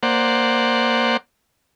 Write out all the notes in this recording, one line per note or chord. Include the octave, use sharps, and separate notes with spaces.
A#3 C5 D5 F#5